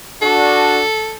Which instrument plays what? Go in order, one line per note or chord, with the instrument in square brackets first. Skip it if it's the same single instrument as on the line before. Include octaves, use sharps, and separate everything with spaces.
[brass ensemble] D4 F#4 [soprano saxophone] A4